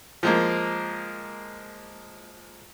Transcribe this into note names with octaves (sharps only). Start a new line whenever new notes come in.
F3 G#3 A#3